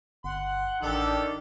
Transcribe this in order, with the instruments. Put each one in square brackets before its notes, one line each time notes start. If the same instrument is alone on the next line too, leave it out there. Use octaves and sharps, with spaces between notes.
[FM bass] G1 [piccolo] F#5 [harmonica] C6
[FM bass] A1 [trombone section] D#3 D4 [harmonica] G4 A4